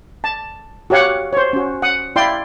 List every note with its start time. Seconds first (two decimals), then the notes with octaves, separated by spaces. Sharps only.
0.24 A5
0.90 F#4 G4 C#5 F5 F#5
1.33 C5 C#5
1.53 C#4 F#4
1.82 F#5 D#6
2.16 E4 D5 F5 G5 C6